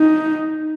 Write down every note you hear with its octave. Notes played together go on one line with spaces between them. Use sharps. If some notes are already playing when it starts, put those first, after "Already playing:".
Already playing: D#4